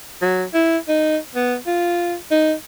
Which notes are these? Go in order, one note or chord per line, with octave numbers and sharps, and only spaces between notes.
F#3
E4
D#4
B3
F4
D#4